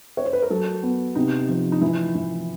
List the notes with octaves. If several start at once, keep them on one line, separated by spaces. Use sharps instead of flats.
C#5
C5
B4
A#4
F#3 A4
B3
C3 D#4
F3
D#4
E3 E4
E3